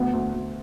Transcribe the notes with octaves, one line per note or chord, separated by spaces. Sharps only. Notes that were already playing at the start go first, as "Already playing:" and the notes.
Already playing: D2 B3
D2
D2